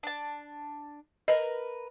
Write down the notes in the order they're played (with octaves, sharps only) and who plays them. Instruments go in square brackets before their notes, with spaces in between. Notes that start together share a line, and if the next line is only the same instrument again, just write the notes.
[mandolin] D4 A5
[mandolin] A#4 B4 [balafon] D#5